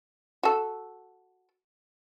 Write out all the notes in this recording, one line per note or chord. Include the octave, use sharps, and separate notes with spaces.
F#4 A4